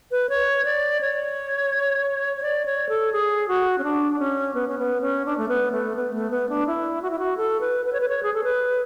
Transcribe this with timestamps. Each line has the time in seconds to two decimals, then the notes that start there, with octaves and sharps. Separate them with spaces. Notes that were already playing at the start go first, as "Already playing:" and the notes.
0.11 B4
0.29 C#5
0.65 D5
1.01 C#5
2.37 C#5
2.42 D5
2.66 C#5
2.89 A4
3.12 G#4
3.48 F#4
3.78 C#4
3.84 D4
4.19 C#4
4.54 B3
4.68 C#4
4.79 B3
5.01 C#4
5.26 D4
5.37 A3
5.48 B3
5.72 A3
5.96 B3
6.14 A3
6.31 B3
6.49 D4
6.67 E4
7.02 F#4
7.10 E4
7.19 F#4
7.37 A4
7.61 B4
7.85 B4
7.93 C#5
8.01 B4
8.08 C#5
8.23 G#4
8.34 A4
8.44 B4